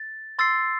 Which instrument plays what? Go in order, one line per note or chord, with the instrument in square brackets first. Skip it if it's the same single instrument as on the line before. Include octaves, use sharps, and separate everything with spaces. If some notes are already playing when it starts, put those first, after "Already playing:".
Already playing: [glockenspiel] A6
C6 E6 A6 C7